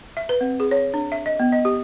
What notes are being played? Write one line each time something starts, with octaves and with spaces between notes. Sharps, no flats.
E5
B4
C4
G#4
C#5
D4
E5
D#5
B3
D#5
G4